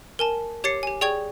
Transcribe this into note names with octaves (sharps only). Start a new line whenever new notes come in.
A#4 G#5 A5
G4 C#5 D6 A6 C7 C#7
G4 G#5
G#4 D5 G5 C#6 G#6 F7